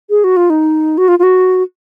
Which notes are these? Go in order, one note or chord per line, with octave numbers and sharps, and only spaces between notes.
G#4
F#4
F4
D#4
F#4
F4
F4
F#4